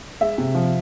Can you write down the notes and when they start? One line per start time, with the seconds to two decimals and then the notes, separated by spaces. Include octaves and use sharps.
0.21 G#3 E5
0.38 C3
0.55 F3